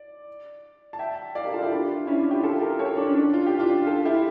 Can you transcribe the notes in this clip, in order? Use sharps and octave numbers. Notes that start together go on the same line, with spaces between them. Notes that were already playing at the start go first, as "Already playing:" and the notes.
Already playing: D5
A5
E5 G5
D5 F5
G4 A#4
F4 A4
E4 G4
D4 F4
C#4 E4
D4 F4
E4 G4
F4 A4
G4 A#4
A4 C#5
D4
C#4
D4
F4
G4
D4 F4
F4 A4
E4 G4